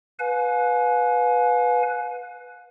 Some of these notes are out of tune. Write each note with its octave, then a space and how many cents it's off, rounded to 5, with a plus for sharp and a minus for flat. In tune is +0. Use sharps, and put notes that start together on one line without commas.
B4 +0 F5 +40 G#5 +30